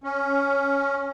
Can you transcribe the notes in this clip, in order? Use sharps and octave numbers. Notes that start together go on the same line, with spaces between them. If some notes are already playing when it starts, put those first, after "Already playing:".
C#4